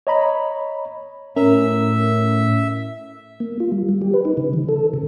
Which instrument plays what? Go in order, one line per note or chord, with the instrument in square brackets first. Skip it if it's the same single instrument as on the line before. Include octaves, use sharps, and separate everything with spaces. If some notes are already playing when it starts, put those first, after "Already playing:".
[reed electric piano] C#5 D#5 A#5 B5
[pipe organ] A2 [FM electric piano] C#4 A#4 [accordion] E5
[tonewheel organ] A#3
F4
G3
G3
G4
B4
D#4
C#3
E3
A4
C#3